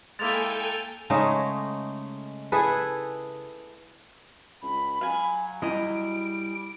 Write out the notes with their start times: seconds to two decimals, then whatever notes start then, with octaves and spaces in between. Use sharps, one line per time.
0.19 G#3 A#3 E4 A4 G5 G#5 A6 F7
1.10 C#3 G#3 A3 D#4
2.52 E4 G#4 A4 B4
4.62 C#2 B5
5.01 F#3 F5 G#5
5.62 G3 E4 D#5 G#5 D7